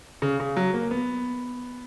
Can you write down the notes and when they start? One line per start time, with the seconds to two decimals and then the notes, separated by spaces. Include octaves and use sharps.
0.22 C#3
0.40 C#3
0.57 F#3
0.74 A#3
0.91 B3